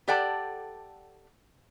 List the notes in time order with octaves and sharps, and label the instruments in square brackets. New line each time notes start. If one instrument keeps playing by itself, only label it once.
[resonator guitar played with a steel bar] G4 A4 D5 F#5 G5 A5